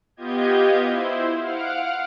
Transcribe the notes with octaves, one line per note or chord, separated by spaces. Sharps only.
B3 F4 G4 D#5 G6 G#6
E4 C5
F5 F#5 F6 D7